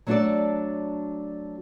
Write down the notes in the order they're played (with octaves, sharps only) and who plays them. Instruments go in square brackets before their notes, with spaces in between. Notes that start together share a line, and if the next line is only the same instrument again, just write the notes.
[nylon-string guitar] F#3 A3 D4 F#4 A4 D5